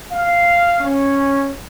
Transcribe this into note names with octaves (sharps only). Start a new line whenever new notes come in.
F5
C#4